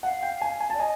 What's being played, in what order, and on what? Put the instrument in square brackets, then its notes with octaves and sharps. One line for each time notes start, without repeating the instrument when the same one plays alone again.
[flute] F5 [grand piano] F#5
[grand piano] G5
G#5
G#5
A5
[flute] D5
[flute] D#5 [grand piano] G#5